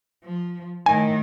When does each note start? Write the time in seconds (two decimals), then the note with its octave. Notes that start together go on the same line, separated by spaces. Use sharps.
0.24 F3
0.86 A2 D#3 G#5